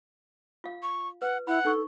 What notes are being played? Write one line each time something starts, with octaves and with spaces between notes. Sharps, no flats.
F4 F5
C#6
B4 F#5
E4 F#5 B5
D4 D#4 A4 C#6